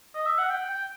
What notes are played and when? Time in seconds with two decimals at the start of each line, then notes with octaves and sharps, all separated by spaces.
0.15 D#5
0.26 E5
0.39 F#5
0.49 G5
0.69 G5